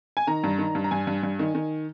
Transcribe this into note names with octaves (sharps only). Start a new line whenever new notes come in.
G#5
D#3 A#5
G2
D#3
G2
A#5
G2 G#5
G2
G2
D#3
D#3